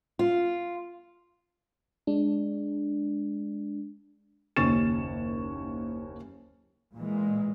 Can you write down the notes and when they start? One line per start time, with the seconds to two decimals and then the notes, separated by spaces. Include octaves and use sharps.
0.19 F4
2.07 G#3 D4
4.56 F#1 D#2 C#4 C#6 A6 E7
6.95 A#2 E3 G#3